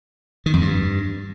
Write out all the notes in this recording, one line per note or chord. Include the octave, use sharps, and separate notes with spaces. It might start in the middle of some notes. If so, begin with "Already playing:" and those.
D#3
F2
G2